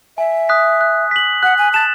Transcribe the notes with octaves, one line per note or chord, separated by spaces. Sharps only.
E5 G#5
D#6 F#6 B6
F#6
B6 F#7
F#5 F#6
G#5
A5 A6 E7